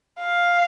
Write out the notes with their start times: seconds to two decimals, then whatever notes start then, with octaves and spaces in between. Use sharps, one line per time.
0.20 F5